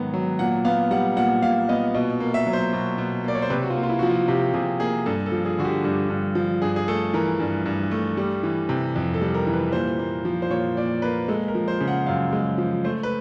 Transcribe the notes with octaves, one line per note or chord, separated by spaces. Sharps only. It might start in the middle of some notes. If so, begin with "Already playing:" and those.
Already playing: G#2 D#3 F#3 B3
F#3
A#2 F#5
B3 F5
G3 F#5
A#2 F#5
A#2 F5
B3 D#5
B2 D#5
A#3
E5
F#3
C5
B2
B2
A#3 D5
C#5
C5
C3 B4
F#4
F4
A#3
F4
E4
F3 F#4
F4
C3 G4
C3 G#4
A#3 G#4
G2 A4
A4
F3
G#4
D3 F#4
G4
G2 G4
G2
F3
G2 G#4
G#4
A3 A4
E3 A#4
G2
G2
A3
G3
E3
C3
F2
A4
G3
A#4
E3
B4
A#2 C5
A#3
F3
C5
A#2 C#5
A#2 D5
A#3 B4
G#3 A4
A#4
F3
C5
C#3
F#5
F#2 F5
G#3
F3
A3 C5
B4